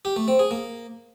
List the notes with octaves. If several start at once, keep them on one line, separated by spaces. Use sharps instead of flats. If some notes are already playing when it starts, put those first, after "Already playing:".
G4
A3
C4
G#4
A#3